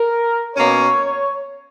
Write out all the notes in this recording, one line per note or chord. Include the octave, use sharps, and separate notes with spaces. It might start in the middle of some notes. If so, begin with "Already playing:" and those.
Already playing: A#4
B2 A#3 C#4 C#5